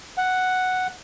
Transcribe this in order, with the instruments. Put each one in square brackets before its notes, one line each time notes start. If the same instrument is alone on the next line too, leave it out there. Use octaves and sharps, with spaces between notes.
[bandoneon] F#5